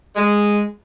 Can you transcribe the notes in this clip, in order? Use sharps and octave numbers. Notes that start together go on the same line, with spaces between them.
G#3